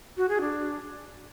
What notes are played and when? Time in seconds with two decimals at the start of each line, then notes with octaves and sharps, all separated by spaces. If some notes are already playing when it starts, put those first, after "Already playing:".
0.17 F#4
0.29 G#4
0.41 D4